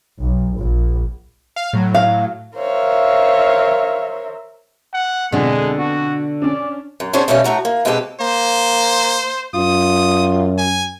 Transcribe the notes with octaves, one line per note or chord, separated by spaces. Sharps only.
B1
A#1
F5
A2 F#3
F5
A#4 C5 C#5 E5 F5
F#5
F2 B2 D3 G#3 B3
F#4
C#4 D4 D5
F#2
C#4 D4 F#4 G#4 C5 C#5
B2 G3 A3 A#3 C#4 A4
A2 A3 F#4 A#5
A#3
B2 G#3 C4 G4 A4 B4
A#3 C5
F#2 F4 D#6
G#5